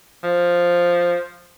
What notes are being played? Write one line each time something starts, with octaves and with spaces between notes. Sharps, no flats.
F3